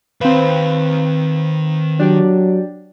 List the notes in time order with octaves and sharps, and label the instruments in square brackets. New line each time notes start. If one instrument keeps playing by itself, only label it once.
[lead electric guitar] D#3 F5 [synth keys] C4 B4
[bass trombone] F#3 [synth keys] D4 G4 D5